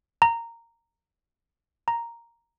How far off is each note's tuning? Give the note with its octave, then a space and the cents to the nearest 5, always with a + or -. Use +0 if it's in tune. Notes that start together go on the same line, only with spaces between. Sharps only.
A#5 -10
A#5 +0